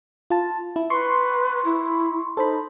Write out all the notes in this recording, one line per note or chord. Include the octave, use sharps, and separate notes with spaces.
F4 A5
E4
B4 C6 C#6
E4
D#4 A4 C5 B5